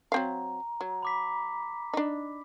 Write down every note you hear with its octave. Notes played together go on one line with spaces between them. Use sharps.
F#3 C4 F5 A#5
F#3
B5 D6 B6
D4 D#4